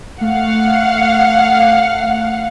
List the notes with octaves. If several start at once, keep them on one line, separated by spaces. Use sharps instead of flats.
A3 F5 F#5